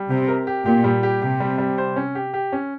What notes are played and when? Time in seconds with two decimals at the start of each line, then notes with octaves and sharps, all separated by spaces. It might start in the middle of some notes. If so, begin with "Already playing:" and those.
Already playing: G3
0.09 C3 G4
0.28 A#4
0.47 G4
0.65 A#2 G4
0.84 G3
1.03 G4
1.22 C3 G4
1.40 G3
1.58 G3
1.78 C5
1.96 C#4
2.15 G4
2.34 G4
2.52 C#4